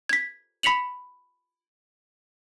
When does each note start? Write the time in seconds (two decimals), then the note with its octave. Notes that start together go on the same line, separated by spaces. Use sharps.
0.09 G#6 B6
0.63 B5 B6 C#7 F7 F#7